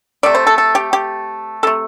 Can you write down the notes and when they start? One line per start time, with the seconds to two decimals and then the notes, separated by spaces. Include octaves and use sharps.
0.23 C3 A3 D5
0.35 C5
0.47 A4
0.58 A4
0.75 G4
0.93 G4
1.63 C3 A3 A4